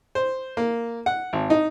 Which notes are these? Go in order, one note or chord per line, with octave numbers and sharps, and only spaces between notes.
C5
A#3
F#5
G#1
D#4